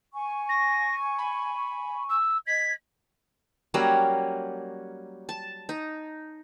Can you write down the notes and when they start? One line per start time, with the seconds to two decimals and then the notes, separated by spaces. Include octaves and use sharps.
0.14 G#5 C#6
0.49 A#6
1.18 B5
2.09 E6
2.47 D#5 G#6 B6
3.74 F#3 G3 A#3 C#4
5.29 A5
5.69 D#4